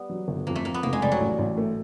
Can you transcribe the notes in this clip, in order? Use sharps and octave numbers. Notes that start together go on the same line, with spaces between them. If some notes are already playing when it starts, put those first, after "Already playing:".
Already playing: G3 B3
F#3
G1
F2 A#3
A3
F2 A#3
B3
F1 A#3
G#3
F1 G3
F#3
A1
A1
A3